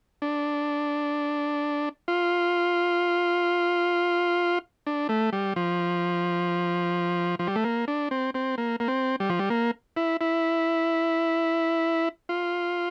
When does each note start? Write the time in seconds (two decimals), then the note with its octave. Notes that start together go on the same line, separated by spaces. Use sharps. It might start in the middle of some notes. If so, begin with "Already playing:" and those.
0.22 D4
2.08 F4
4.87 D4
5.09 A3
5.33 G3
5.56 F3
7.39 F3
7.47 G3
7.56 A3
7.64 A#3
7.88 D4
8.11 C4
8.34 C4
8.58 A#3
8.80 A#3
8.88 C4
9.20 G3
9.30 F3
9.39 G3
9.50 A#3
9.97 E4
10.21 E4
12.29 F4